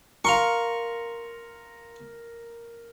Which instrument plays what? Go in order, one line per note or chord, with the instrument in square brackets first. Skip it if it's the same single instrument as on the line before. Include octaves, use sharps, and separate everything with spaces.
[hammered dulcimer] A#4 [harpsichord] F5 C6 C#6